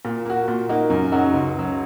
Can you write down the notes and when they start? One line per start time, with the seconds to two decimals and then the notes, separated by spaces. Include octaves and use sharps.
0.05 A#2
0.25 A#3 F#4
0.48 A#2
0.69 A#3 D#4 F#4
0.90 F#2
1.12 C#3 F#3 D#4 F#4
1.33 C#2
1.55 C#3 F#3